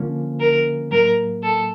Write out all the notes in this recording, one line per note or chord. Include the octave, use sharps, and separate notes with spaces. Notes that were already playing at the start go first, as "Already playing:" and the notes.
Already playing: D3 F3 A#3 C#4
A#4
A2 F#3 A#3 A#4
A4